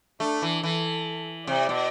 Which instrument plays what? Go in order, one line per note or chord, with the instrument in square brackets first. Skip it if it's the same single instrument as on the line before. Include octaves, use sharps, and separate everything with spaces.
[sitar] A3 [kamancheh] D4
[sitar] E3
[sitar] E3 [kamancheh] A4
[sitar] C3 [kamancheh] D5
[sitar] B2